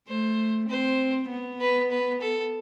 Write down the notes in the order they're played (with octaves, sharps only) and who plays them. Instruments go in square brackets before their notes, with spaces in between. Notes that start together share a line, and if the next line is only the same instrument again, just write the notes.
[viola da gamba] A3 [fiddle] C5
[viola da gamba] C4 [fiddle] C5
[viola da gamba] B3
[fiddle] B4
B4
A4